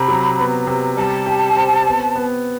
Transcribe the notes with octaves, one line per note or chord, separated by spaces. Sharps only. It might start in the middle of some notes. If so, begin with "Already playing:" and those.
Already playing: C3 B5
F#3
B3
C3
G3 A5
G4
C4
B3
B3